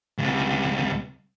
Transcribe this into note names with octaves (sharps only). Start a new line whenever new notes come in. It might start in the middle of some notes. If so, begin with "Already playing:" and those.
C#2 C3